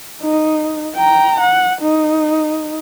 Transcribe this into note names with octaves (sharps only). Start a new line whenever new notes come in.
D#4
G5 A#5
F#5
D#4